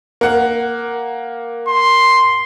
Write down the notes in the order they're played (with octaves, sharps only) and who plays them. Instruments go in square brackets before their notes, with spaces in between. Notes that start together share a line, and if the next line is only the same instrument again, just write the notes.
[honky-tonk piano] A#3 F#5
[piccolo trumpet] C6